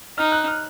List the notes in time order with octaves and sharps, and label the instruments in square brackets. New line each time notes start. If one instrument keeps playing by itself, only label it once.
[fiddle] D#4 [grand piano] F6
[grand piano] F#6
F6